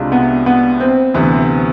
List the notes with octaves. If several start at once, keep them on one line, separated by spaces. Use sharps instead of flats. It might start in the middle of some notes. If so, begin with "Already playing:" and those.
Already playing: C2 C3 G#3 D4 F4
B3
B3
C4
D2 C3 E3 B3